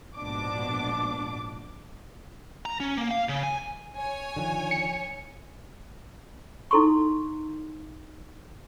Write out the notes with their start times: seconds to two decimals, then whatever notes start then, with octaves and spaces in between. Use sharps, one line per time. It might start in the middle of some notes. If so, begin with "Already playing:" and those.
0.17 A#1 G#2 B2 D4 D6
2.65 A#5
2.80 C#4
2.97 A#3
3.11 F5
3.29 C#3
3.43 G#5
3.96 C#5 G#5
4.36 D3 D#3 F3
4.71 C#7
6.71 D#4 E4 A4 C6 C#6